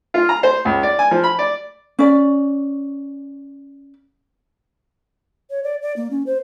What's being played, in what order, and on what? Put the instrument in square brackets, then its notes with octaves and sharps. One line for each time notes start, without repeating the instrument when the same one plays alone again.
[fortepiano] F4
A#5
C5
C#2
D5
G#5
F3
B5
D5
[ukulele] C#4 D5
[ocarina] C#5
D5
D5
A#3
C#4
C5